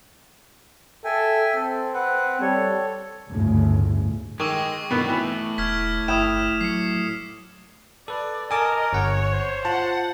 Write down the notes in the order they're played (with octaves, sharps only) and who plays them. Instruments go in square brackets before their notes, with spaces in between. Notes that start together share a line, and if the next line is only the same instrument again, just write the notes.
[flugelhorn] A4 [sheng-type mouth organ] E5 G5 G#5
[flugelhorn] C4 [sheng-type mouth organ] A4
[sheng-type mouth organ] B4 F#5
[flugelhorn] G3 [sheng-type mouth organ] A4 C#5
[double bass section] G1 D2 A2 C#3
[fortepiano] D#3 [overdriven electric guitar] G#3 [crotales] C#6 D6 E6
[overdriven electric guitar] G2 C4 [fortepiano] B2 D#3 B3
[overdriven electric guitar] A2 [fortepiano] E3 B3
[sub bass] E1 [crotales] F6 G#6 B6
[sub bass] G1 [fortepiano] E4 G5 [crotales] D#6 E7
[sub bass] F#3 [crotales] C7 C#7
[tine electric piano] A4 B4 [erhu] D5
[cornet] A#4 [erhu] D#5 [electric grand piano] G#5 [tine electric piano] A5 D6 D#6
[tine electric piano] G1 F#5 [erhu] C#5
[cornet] C5
[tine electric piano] F4 [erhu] F#5 [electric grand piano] A5